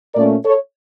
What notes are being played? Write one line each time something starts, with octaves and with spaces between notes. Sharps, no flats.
A#2 A3 C#4 A#4 D5
A4 C#5